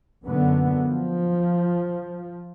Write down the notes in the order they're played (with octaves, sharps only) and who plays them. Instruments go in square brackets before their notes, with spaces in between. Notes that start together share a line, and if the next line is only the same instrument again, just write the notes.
[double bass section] F#2 D3 B3
F3